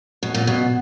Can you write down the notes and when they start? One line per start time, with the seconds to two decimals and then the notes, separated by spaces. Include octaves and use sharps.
0.23 B2
0.34 A#2
0.47 B2